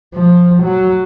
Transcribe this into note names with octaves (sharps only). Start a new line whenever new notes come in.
F3
F#3